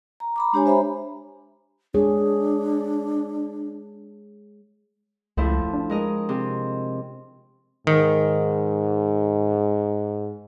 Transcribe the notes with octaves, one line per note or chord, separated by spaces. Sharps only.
A#5
A#5 B5 D6
G#3 D4 G4 C#5 G#5
C5 E5 A#5 B5
G#3 D4 G#4 C#5
C#2 A2 F3 E4
D4
G#3 A#4 D#5
C3
G#2 D#3